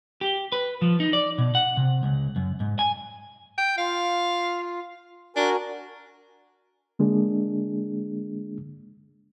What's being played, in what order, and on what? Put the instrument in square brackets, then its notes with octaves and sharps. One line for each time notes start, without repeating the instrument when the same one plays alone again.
[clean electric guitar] G4
B4
F3
D#4
D5
B2
F#5
C3
C#2
F#2
G#2
G#5
[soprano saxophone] G5
[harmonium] F4 [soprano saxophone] F5
[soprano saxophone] D4 [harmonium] F#4 A#4 G#5
[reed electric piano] D3 G#3 A#3 D4 G#4